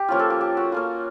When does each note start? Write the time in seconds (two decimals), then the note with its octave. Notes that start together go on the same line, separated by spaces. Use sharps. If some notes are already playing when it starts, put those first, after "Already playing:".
Already playing: G4
0.08 F3 A#3 C#4 F4
0.19 A4
0.30 G4
0.41 G4
0.57 F#4
0.72 A#3 C#4 F4